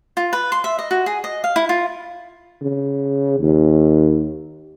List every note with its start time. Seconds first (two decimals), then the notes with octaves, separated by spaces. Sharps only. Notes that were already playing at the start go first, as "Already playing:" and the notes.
0.17 F4
0.33 B4
0.52 C6
0.64 E5
0.79 D#5
0.91 F#4
1.06 G#4
1.24 D#5
1.44 F5
1.56 E4
1.69 F4
2.62 C#3
3.40 D#2